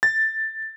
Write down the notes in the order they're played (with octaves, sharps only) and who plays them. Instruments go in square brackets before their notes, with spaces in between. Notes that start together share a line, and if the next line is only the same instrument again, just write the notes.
[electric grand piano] A6